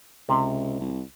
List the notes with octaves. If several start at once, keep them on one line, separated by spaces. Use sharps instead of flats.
C#2 C3
C2